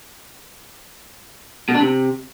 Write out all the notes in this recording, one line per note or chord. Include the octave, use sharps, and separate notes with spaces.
B2
D4
C3